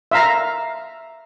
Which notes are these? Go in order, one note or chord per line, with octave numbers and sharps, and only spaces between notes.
E5 F5 A#5